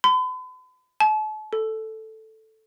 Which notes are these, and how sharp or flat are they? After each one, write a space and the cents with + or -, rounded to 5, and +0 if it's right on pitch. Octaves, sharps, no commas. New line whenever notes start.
B5 +45
A5 -40
A4 +0